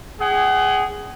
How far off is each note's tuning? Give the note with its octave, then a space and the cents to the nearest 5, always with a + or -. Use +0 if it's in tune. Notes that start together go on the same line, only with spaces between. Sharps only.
G#4 -5 F#5 +35